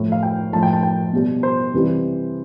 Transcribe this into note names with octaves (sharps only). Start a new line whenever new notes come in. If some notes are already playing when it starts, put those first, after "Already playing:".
Already playing: A2 F3
F5
G5
A2 F3 A5
G5
A5
G5
B2 G3
C5
C3 E3 G3